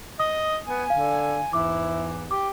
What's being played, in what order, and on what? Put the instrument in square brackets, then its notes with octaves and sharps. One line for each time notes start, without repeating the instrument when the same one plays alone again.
[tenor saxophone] D#5 [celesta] D#6
[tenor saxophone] B3 [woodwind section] G#5
[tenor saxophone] D3 [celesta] F5
[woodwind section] E2 G#2 E3 [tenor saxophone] E4 [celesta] D6
[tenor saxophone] G4 [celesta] D6